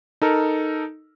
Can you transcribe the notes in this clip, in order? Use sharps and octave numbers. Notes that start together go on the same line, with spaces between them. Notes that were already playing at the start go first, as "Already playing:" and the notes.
D#4 A4 A#4